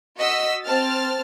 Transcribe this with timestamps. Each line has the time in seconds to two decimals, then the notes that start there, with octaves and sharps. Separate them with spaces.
0.18 F#4 D#5 E6 B6
0.63 C4 A5 F6 A6